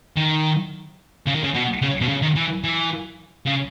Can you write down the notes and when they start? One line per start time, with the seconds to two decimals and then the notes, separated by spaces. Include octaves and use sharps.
0.17 D#3
1.27 C#3
1.35 D#3
1.43 C#3
1.54 B2
1.82 C#3
2.01 B2
2.08 C#3
2.23 D#3
2.36 E3
2.64 E3
3.46 C#3